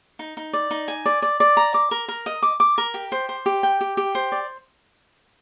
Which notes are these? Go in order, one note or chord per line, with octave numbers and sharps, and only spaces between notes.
D#4
D#4
D5
D#4
G#5
D5
D5
D5
A#5
D6
A#4
A#4
D#5
D6
D6
A#4
G4
C5
C5
G4
G5
G4
G4
C5
D5